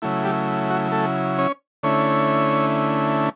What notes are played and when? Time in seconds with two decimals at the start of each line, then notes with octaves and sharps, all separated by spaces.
0.02 C#3 F#3 A3 E4
0.24 G3 G4
0.70 F#4
0.92 A3 A4
1.38 C#4 C#5
1.83 D3 A3 C#4 E4 C#5